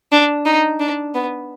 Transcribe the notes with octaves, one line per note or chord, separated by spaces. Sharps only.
D4
D#4
D4
B3